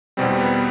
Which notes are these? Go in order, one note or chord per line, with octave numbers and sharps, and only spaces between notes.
E2 B2 G3 C4
B3